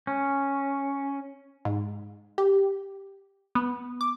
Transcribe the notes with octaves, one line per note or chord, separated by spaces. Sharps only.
C#4
G#2
G4
B3
D6